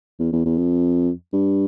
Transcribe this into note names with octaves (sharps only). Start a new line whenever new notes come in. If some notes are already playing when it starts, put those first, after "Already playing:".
E2
E2
E2
F2
G2